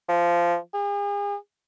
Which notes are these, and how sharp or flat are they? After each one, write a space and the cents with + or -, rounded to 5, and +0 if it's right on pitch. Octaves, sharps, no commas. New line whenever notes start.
F3 -15
G#4 -40